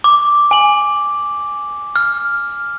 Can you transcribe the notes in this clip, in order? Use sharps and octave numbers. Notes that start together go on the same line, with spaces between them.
D6
G#5 F#7
F6